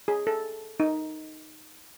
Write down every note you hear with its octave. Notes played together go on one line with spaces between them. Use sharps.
G#4
A4
D#4